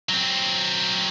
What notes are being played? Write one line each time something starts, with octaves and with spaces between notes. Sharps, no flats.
F#3 C4